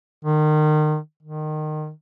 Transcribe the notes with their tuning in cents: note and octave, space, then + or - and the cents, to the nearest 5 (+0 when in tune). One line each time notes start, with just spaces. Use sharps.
D#3 -30
D#3 -20